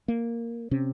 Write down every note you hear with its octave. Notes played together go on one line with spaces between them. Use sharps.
A#3
C3 C#4